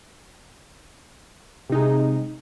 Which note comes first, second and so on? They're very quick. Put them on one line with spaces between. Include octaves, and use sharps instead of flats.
C3 D#4 G#3